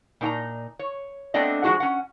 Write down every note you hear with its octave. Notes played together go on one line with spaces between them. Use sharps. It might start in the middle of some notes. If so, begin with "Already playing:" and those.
A#2 D#4 G#5 A#5
C#5
A3 B3 C4 D4 D5 D#5
F3 G#3 D#4 F4 F#4 G#4
C#4 F#5